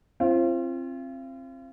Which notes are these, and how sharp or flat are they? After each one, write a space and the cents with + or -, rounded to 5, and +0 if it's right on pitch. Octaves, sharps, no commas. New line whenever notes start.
C4 +20 F4 -35